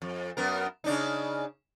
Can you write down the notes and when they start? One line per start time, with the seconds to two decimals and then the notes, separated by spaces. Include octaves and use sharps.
0.02 F2
0.37 F#2 B3 A#4
0.84 C#3 D4 D#4